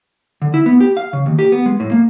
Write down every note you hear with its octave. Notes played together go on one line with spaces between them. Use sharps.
D3
E4
B3
G4
F5
C#3
D#2
G4
B3
G#3
A2
A#3